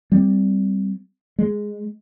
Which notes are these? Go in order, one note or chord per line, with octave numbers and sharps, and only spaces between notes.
G3 C4
G#3